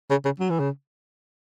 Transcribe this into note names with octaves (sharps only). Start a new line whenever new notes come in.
C#3
C#3
F#3
E3
C#3